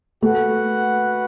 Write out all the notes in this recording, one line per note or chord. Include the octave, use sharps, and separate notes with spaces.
A3 F#4 B4 F#5